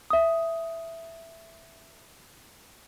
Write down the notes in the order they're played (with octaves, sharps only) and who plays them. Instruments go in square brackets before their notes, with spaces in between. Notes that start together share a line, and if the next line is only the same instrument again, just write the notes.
[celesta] E5 D#6